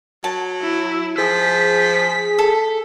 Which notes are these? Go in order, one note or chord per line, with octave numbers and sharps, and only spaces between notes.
F#3 A5
E4
F3 G#4 B6
A4